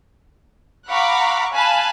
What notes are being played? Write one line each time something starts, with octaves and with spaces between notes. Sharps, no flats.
F5 F#5 A#5 B5 C#6 D6
F5 G#5 A5 B5 F#6